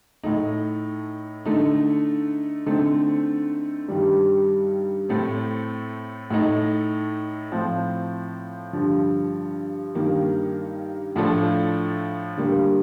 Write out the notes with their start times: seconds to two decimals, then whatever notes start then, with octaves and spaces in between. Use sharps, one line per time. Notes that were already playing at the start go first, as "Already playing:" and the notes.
0.23 A2 A3 D#4
1.46 D3 A3 D#4
2.66 D3 A3 C4 D#4
3.88 G2 D#3 G3
5.09 A2 A3 C4
6.30 A2 A3 D#4
7.52 A2 F3 C4
8.73 G2 D3 F3
9.95 G2 D#3 A#3
11.16 A2 F3 A3 D4 F4
12.37 D3 G3 A#3